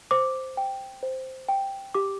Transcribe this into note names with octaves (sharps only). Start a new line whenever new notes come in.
C5 D6
G5
C5
G5
G4 D6